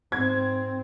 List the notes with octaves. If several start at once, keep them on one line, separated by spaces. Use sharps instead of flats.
G#2 C4 G#6